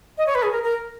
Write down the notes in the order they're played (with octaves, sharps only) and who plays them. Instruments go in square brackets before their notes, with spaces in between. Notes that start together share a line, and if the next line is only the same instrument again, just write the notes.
[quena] D#5
C#5
B4
G#4
A#4
A#4